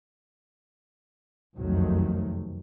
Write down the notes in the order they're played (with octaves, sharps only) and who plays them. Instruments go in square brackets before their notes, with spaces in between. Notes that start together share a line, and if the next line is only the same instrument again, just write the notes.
[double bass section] F#1 C2 F2 D#3 F#3 A3